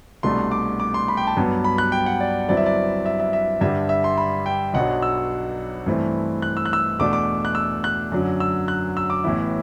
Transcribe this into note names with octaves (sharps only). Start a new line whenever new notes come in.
C2 B2 A3 D4 C6
D6
D6
C6
B5
G5
A5
G2 F#3 B3
B5
F#6
G5
F#5
D5
G1 G2 F#3 C4 E4 D5
E5
D5
E5
E5
E5
G2 D3 G3 D4 E5
E5
C6
B5
G5
B1 B2 F#3 B3 D4 F#5
E6
G2 E3 A3 C4 E4
F#6
E6
F#6
E6
E2 B2 A3 D4 D6
D6
F#6
E6
F#6
F#2 D3 F#3
E6
F#6
E6
D6
A1 A2 E3 B3 E4